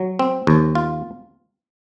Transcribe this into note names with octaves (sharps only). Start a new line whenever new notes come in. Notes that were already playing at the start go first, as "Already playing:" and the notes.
Already playing: F#3
C4
D#2
F4